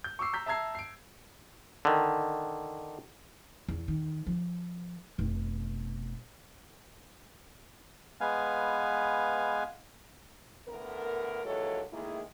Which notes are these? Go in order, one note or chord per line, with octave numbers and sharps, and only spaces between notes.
G6
C#6 D6 E6 C7
A#5 G6 B6
E5 A5 A#5 E6 G#6 C7
C7 D7
D3 D#3
E2
D#3
F3
F1 B2
G#3 B3 B4 F5 G#5
A2 D3 B3 A#4
D#2 E3 F#3 G#3 A4 C#5
A2 D#3 G#3 A#3 E4 G#4